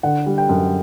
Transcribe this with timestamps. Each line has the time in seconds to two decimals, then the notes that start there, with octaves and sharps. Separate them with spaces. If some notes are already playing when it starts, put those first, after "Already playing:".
0.03 D3 F#5
0.26 G3
0.38 G5
0.49 F#2